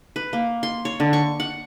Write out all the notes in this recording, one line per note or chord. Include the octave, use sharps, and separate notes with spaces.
B4
A#3
C6
C#5
D3
C#6
F#5